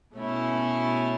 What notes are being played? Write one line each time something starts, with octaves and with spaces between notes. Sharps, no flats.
B2 A3 C#4 E4